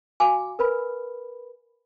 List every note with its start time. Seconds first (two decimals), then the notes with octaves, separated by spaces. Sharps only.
0.20 F#4 F5 G#5 D6
0.59 A#4 B4 B5